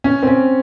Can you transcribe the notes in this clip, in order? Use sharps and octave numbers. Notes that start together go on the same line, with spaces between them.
C#4
C4
C#4